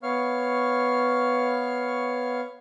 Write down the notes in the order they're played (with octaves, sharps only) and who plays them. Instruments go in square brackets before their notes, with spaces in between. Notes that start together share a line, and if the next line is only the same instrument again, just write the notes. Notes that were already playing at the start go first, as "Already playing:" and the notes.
[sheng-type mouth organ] B3 C#5 F5 C#6 F6